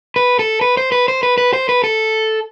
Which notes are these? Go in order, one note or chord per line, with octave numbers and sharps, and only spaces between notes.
B4
A4
B4
C5
B4
C5
B4
B4
C5
B4
A4